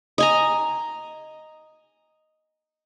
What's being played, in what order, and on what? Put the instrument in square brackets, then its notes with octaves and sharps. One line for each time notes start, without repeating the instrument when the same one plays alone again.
[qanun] D#5 G#5 A#5